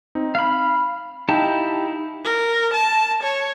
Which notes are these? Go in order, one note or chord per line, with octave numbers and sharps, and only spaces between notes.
C4 D#4
F5 B5 F6
D#4 E4 G4 F5 G5 A5
A#4
A5
C#5